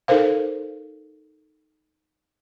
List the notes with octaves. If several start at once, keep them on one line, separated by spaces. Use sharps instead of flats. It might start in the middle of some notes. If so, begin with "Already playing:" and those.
D#4 A4 A#4 C5 F5